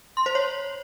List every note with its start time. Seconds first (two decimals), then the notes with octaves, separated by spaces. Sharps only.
0.17 C6
0.26 C5
0.35 C#5